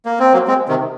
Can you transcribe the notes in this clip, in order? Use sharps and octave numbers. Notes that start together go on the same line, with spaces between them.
A#3
C4
F#3 A#3
G#3 C4
C3 D#3